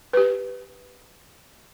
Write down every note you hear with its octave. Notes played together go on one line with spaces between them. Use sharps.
G4 B4